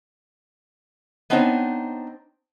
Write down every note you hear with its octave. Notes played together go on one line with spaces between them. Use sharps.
B3 C4 D4 D#4 C5 C#5